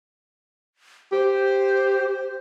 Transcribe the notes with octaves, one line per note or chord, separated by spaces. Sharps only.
G4 C5